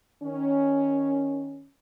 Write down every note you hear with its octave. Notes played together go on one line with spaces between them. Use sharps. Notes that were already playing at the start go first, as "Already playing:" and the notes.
D#3 C#4